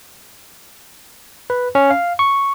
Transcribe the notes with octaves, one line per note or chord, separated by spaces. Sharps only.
B4
C#4
F5
C#6